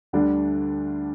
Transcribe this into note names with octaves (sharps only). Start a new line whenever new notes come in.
D2 D3 G3 D4